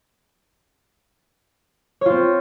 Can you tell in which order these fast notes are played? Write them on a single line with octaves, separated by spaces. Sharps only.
C#5 F4 C4